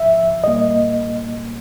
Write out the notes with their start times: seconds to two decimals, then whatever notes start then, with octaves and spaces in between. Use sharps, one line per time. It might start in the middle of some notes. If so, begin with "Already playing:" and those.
Already playing: G#2 F3 E5
0.44 A#2 G3 A#3 D#5